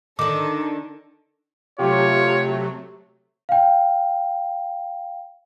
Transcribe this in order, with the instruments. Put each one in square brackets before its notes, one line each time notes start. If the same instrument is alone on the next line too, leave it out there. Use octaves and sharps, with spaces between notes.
[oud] D3 D#3 [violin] A4 [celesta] D6
[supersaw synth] C3 F#3 A3 [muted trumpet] F4 [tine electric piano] G4 [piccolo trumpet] C#5
[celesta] F5 G5